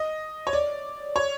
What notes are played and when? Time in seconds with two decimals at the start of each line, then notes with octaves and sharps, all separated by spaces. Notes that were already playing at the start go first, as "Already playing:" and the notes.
Already playing: D#5
0.47 C#5
0.53 D5
1.16 C#5